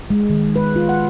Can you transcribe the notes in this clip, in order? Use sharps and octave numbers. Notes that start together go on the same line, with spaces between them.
G#3
D#3
B4
F4
F#5